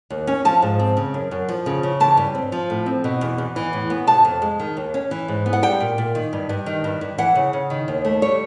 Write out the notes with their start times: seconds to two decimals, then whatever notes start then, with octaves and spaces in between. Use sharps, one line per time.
0.10 D#2
0.27 C#4
0.45 F3 A5
0.62 G#2
0.79 C4
0.97 C#3
1.14 F#2
1.31 F#2
1.49 F3
1.66 C#3
1.83 C#3
2.00 E3 A5
2.17 G2
2.35 C4
2.52 F3
2.70 A2
2.86 C4
3.04 B2
3.21 E2
3.38 E2
3.56 E3
3.73 A2
3.90 B3
4.07 C3 A5
4.25 F2
4.42 G#3
4.60 D#3
4.77 D#2
4.94 C#4
5.11 E3
5.28 G#2
5.46 B3
5.53 F#5
5.63 G3 G5
5.80 A#2
5.98 A#2
6.15 D#3
6.33 G2
6.49 G2
6.66 D#3
6.84 G2
7.01 G2
7.18 E3 F#5
7.35 C#3
7.53 C#3
7.70 D#3
7.88 D#2
8.05 A3
8.22 G3 C#5